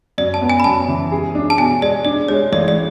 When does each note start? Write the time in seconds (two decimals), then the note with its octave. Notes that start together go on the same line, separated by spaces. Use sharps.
0.18 F#2 D5
0.34 A5
0.41 B3
0.50 G#5
0.60 B5
0.64 F#2 A5
0.89 E3
1.12 G#4
1.35 D4
1.50 A5
1.58 B2 G#5
1.82 G#3 D5
2.05 D4 D5
2.28 G#3 C#5
2.52 A1 D5
2.68 D5